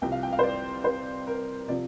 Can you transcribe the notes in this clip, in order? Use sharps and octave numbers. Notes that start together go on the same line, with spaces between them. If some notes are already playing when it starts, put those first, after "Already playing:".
C2 C3 F3 G5
F5
G5
F5
C5
D5
C5
A#4
C3 F3 D5